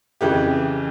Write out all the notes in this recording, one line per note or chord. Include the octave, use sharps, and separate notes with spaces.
F2 C#3 E3 G4